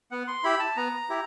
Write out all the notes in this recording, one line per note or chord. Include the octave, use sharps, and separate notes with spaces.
B3 F#5
C6
E4 G4 B5
A5
B3 A#5
E4 G4